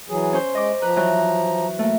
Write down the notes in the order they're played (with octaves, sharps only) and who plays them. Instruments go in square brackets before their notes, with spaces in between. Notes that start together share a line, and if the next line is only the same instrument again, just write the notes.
[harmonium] E3 F#3 G#4
[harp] C#4 C5
[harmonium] G#3 [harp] D#5 D6
[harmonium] F3 A#5 [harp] B4
[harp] E3 F#3
A3 A#3